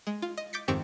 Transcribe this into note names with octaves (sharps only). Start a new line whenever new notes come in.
G#3
F4
D#5
D6 G6 A6 B6 C#7
F2 G#2 D#3 C4 G4 C#6